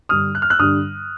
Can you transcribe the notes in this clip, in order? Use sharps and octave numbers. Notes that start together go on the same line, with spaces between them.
G2 D3 G3 D#6 F6
F#6
F6
E6 F#6
G2 D3 G3 D#6 F6